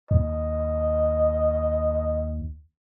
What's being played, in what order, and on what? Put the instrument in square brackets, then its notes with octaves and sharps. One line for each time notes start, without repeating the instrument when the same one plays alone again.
[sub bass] D#2 [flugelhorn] D#5